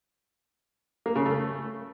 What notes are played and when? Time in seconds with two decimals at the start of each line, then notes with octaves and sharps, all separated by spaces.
1.06 A#3
1.16 C#3
1.26 A3